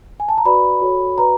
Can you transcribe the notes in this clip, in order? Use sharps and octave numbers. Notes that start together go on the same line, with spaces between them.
G#5
A5
A#5
F#4 B4 D5 B5
F#4 A4 C#5
F#4 B4 D5 A#5